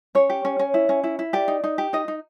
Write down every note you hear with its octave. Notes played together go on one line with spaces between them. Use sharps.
C#4 C#5
G4
C#4
C#4
E4
C#4
E4
E4
G4 D5
D#4
D#4
G4
D#4 D#5
D#4